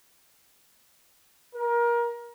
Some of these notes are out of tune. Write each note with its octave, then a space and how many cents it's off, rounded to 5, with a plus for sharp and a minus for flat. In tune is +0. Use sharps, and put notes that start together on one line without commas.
A#4 +25